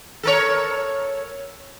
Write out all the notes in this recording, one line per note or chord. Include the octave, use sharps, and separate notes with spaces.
A4 A#4 C#5